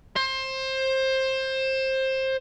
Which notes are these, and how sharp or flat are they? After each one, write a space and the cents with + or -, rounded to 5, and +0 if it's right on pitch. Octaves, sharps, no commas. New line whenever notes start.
C5 +20